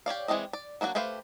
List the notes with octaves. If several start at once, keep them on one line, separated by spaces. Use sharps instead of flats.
G4 C#5 D5 F5
E3 G#3 C4 D5 D#5
D5
F#3 A#3 D4 F#4
A3 G4 B4 C5 F5